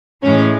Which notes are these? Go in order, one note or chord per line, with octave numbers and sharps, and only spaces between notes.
A2 E3 G#3 C#4